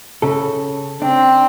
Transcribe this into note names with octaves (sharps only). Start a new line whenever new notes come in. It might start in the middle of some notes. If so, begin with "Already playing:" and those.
C#3 A4
C4 D4